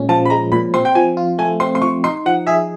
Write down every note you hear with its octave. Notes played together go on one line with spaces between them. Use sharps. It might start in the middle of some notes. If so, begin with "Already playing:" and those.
Already playing: A#2 G#3 C#4
F3 A5
B5
G#3 A#5
A#2 B5
C4 C6
G5
F3 G#5
F4
A3 G#5
C4 C6
C6
F3 C#6
D#4 C6
F3 F#5
G#4 E5